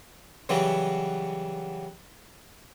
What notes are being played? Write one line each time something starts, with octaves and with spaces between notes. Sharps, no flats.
C#3 E3 F#3 G3 B3